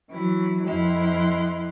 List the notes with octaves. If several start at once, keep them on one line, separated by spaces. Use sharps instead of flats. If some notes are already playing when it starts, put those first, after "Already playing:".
E3 F#3 E4
F2 E4 D#5 F#5 C6 F6